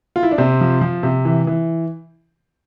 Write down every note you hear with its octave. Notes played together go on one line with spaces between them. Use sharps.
F4
E4
D4
C3 C4
F3
F3
C3
E3
E3